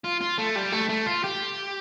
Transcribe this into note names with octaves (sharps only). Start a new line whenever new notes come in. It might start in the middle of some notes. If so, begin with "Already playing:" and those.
F4
F4
A3
G3
A3
A3
F4
G4